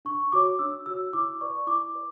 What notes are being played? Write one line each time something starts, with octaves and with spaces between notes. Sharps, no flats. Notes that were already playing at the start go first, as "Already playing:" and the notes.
D4 C#6
F#4 C#5 D6
D4 E6
F#4 C#5 E6
E4 D6
B4 D5 C#6
E4 D6
B4 D5